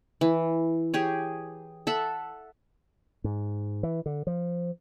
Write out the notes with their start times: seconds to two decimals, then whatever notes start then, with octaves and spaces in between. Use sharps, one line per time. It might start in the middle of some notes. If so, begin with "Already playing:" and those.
0.21 E3
0.94 G4 G#4 C#5
1.87 A4 E5 F#5
3.24 G#2
3.83 E3
4.06 D3
4.27 F3